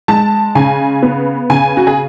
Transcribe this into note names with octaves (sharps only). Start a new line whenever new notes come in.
G#3 A5
C#3 G#5
B3
C#3 G#5
F#4
G#4